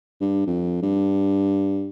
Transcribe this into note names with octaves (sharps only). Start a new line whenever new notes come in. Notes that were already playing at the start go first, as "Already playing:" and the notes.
G2
F2
G2